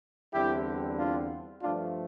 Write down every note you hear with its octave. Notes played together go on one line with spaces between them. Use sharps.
E2 D3 G3 C4 E4 G4
D4 F4
G2 F3 A3 D4 F4